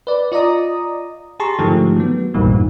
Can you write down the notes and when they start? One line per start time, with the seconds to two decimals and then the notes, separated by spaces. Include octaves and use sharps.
0.07 B4 D5
0.32 F4 D5 D#5 A#5 D#6
1.39 G4 G#4 A5 A#5 C6 C#6
1.58 G#2 D3 D#3 F3 A3 G4
1.97 F#3 B3
2.34 A#1 E2 G2 A#2 D#3 G3